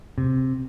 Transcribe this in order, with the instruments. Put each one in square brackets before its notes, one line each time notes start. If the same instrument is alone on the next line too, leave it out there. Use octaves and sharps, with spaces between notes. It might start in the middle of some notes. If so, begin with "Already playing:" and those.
[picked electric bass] C3